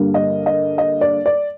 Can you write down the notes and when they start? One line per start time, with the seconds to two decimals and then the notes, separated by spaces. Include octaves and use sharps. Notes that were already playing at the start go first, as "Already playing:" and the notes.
Already playing: G2 D3 G3 A#3
0.14 D#5
0.46 D#5
0.78 D#5
1.01 D5
1.26 D5